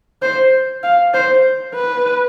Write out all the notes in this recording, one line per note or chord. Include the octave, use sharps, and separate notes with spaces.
C5
F5
C5
B4